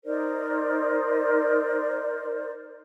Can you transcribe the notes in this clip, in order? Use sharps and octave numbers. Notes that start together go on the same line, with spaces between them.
D#4 A#4 C5 D5